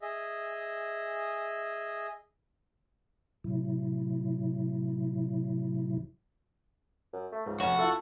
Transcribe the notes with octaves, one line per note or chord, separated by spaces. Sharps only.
G#4 D#5 E5
A2 C3 F#3 E4
F#2
A3
C#2 G#2
F1 C#4 F#4 F#5 E7
E4 F4 A4 E5